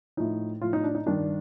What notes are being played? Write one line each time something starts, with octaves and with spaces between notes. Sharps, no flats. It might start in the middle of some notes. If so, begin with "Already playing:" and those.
A2 F3 D#4
A2 F3 F4
D#4
D4
D#4
G2 D#3 D4